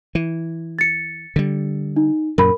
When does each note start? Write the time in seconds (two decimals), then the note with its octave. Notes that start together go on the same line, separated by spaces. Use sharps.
0.15 E3
0.79 A6 C#7
1.36 D3 G3
1.96 D#4
2.38 F#2 A#2 A#4 B5